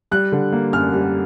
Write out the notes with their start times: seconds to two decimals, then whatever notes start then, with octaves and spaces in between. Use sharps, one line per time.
0.11 G3 F#6
0.32 D3
0.53 A#3
0.73 F#2 F6
0.93 G3